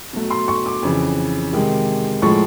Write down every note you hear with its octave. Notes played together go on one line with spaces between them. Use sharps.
B2 F#3 A3
C6
C#6
D6
F2 C#3 E3
C3 D#3 G#3
A2 F3 G#3 C#6